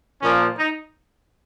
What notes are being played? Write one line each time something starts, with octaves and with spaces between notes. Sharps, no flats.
A#2 F3 A#3 C#4
D#4